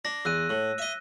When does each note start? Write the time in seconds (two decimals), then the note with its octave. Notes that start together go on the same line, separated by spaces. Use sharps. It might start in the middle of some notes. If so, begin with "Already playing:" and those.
0.05 D4 A#6
0.25 E2 E6 F#6 D#7
0.49 A2
0.78 D#5 E5